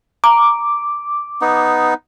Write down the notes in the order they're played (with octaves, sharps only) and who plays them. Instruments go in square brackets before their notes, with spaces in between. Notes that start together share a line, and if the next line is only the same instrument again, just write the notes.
[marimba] A#5 [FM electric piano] D6
[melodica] B3 D#4